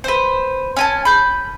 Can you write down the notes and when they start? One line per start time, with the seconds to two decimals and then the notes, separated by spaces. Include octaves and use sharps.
0.04 B4 C5
0.76 C#4 G#5 A5
1.05 B5 G6